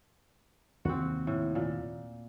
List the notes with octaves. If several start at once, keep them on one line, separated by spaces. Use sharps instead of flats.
D#2 C3 C4 F#4
A2
A#2